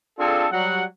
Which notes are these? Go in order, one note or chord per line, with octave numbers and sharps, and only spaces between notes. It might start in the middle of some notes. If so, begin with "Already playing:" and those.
C4 D4 F4 G#4 A4
F#3 G3 F#5